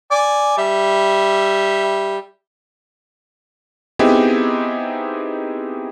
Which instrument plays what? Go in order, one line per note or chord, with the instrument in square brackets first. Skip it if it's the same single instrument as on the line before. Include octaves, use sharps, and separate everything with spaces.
[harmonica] D5 G#5
G3 E5
[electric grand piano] B3 C4 D#4 E4 G4 G#4